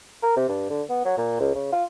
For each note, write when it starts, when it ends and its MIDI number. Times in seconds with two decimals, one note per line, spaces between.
0.23 0.35 70
0.37 0.48 48
0.49 0.67 43
0.70 0.82 50
0.89 1.05 59
1.05 1.18 54
1.18 1.38 46
1.40 1.54 37
1.55 1.68 49
1.72 1.84 65